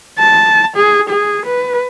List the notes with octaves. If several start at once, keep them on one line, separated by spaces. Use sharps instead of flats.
A5
G#4
G#4
B4